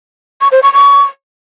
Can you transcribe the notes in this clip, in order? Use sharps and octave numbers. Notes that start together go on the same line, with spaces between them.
C#6
C5
C#6
C#6